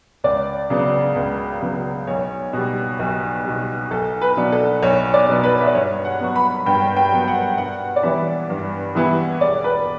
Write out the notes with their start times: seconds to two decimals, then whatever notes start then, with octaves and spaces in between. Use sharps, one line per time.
0.24 C#2 D5
0.70 C#3 F#3 B3 D4
1.16 C#2
1.61 C#3 F#3 B3 D4
2.07 B1 C#5
2.53 B2 G3
2.99 B1
3.45 B2 G3
3.91 B1 A4
4.22 B4
4.37 B2 F#3 B3 D4
4.52 A4
4.82 B1 C#5
5.14 D5
5.29 B2 F#3 B3 D4
5.44 B4
5.61 E5
5.67 D5
5.74 G2 C#5
6.05 F#5
6.20 F#3 B3 C#6
6.36 B5
6.66 G2 G5
6.97 G5
7.12 F#3 B3
7.28 F#5
7.58 G2 F#5
7.96 D5
8.03 E3 G3 B3 E4 E5
8.50 G2
8.95 E3 G3 B3 E4
9.41 E1 D5
9.64 B4